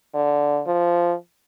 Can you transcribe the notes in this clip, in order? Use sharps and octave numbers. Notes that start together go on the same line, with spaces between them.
D3
F3